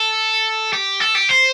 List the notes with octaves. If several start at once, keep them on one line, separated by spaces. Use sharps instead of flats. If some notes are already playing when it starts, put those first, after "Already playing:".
Already playing: A4
G4
A4
G4
C5